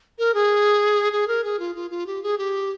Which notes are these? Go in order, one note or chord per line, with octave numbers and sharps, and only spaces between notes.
A#4
G#4
G#4
A#4
G#4
F4
F4
F4
G4
G#4
G4